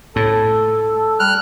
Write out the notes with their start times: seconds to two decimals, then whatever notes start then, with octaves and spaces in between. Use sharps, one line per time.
0.16 A2 A4
1.20 G3 F6 F#6